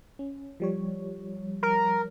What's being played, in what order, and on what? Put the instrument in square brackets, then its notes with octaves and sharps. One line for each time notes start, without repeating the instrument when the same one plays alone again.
[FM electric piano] C#4
F3 G3 C#5
[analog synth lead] A#4